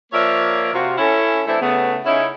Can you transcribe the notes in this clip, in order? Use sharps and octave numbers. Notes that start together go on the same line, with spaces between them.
F3 A#3 A#4 C#5 D5 E5
C3 F4 F#4
C#4 E4 A4
E3 A3 C4 D4 E4
C#3 A3 B3
C#3 C#4 D#4 E4